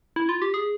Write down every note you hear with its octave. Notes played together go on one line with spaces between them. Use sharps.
E4
F4
G4
G#4